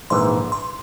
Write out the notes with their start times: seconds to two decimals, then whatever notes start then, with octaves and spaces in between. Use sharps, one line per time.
0.10 A#1 G#2 E3 C6
0.52 C6